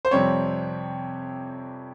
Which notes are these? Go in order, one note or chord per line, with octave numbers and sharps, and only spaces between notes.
C5
F2 C3 G3 C4 C#5